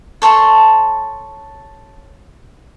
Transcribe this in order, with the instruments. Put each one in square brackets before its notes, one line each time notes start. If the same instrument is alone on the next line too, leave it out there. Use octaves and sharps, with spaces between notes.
[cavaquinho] A4 C#5 A5 C6